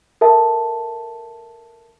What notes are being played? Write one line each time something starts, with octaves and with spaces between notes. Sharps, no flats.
A4 A#4 E5 A5